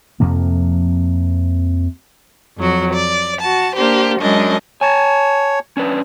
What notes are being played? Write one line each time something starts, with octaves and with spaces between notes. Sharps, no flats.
F2 C3 F3 A#3
F2 F#3 F#4
D5
F#4 A5
A#3 D4 G4 C5
F#2 G#3 D4 D#5
C#5 G#5 A5
C#4 D4 B4